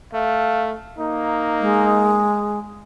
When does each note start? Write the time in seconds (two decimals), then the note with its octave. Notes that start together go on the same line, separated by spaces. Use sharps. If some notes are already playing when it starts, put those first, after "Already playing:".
0.13 A3 F5
0.99 A#3 D#4
1.60 G#3